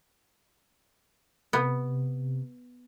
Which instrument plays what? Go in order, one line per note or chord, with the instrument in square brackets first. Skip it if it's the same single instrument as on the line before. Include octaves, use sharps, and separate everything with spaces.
[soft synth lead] C3 [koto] B3